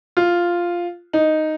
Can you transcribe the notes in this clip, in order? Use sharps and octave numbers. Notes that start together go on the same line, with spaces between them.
F4
D#4